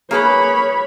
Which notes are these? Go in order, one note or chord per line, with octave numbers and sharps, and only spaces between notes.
A#3 G#4 B4 C#5 B5